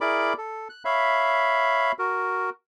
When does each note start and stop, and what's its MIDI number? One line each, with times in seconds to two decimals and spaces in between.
0.01 0.33 64
0.01 0.33 68
0.01 0.33 70
0.01 0.33 74
0.01 0.33 83
0.01 0.33 86
0.38 0.68 69
0.69 0.83 90
0.85 1.92 73
0.85 1.92 76
0.85 1.92 77
0.85 1.92 83
1.99 2.50 66
1.99 2.50 70